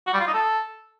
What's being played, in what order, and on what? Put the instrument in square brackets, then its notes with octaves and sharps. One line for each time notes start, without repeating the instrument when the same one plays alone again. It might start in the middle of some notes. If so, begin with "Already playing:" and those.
[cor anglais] F#4
G3
F4
D#4
A4